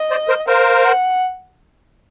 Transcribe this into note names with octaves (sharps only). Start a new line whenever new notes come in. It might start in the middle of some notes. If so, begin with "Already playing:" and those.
Already playing: D#5
C5 D5
A#4 C5
A#4 C5 F5
F#5